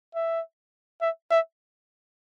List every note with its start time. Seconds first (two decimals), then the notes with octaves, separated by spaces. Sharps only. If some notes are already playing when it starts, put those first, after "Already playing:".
0.15 E5
1.01 E5
1.31 E5